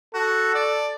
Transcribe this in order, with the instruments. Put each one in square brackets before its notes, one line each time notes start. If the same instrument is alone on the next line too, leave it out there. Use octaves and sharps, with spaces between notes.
[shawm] F#4 [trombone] A4
[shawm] D5